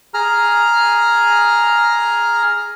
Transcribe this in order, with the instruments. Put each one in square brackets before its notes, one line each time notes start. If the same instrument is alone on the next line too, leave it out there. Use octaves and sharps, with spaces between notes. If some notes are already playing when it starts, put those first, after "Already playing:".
[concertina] G#4 A#5 F6